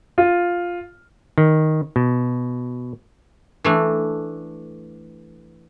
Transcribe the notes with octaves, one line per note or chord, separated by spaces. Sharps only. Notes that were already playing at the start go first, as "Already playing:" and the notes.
F4
D#3
B2
E3 A3 D4